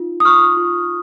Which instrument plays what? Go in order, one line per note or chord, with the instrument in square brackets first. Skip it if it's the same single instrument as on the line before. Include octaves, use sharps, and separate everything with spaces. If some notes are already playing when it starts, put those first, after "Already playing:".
Already playing: [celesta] D#4 F4
D#6
F4 C#6 F6
F4